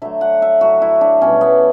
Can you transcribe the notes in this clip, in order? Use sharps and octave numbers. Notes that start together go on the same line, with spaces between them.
D3 F#3 A3 E5
F#5
E5
A2 F#3 A3 F#4
E4
D4
B2 G3 C#4
B3